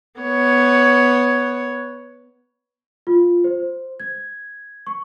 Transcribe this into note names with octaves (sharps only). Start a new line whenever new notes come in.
B3 C#5
F4
C5
G#6
C#6